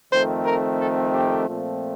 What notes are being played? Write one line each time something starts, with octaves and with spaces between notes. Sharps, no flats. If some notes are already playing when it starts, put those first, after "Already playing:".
F2 D#3 A3 C4 C5
A#4
A4
G4
A#2 F3 A3 C4